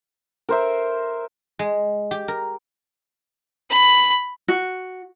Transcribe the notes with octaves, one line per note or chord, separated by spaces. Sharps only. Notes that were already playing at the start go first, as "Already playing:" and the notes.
A#4 C5 E5
G#3
G4
A#4
B5
F#4